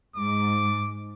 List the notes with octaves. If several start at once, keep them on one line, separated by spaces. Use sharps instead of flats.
G#2 D6